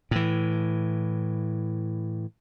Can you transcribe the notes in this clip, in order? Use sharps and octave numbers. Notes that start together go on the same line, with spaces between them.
A2 E3